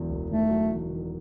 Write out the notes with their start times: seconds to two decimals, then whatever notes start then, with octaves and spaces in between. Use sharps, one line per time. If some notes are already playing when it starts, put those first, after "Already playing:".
Already playing: E1 E2 F#3
0.10 E1
0.30 D#3 A3
0.50 F#3
0.70 E2
0.90 D#3